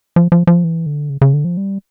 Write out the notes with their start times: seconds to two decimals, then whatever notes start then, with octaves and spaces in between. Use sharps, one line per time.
0.16 F3
0.32 F3
0.47 F3
0.64 E3
0.86 D3
1.10 C#3
1.21 C#3
1.34 D3
1.45 F3
1.57 G3